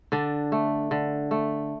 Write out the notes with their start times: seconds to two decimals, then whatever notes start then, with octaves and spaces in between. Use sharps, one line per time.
0.12 D3 D4
0.52 A3
0.91 D3
1.31 A3